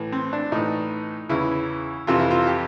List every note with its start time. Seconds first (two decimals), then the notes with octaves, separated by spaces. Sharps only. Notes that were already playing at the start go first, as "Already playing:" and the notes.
Already playing: A2 E3
0.12 C4
0.33 D4
0.52 A2 E3 D#4
1.29 E2 C#3 E3 E4
2.07 F2 C3 E3 F4
2.19 E4
2.31 F4
2.47 G4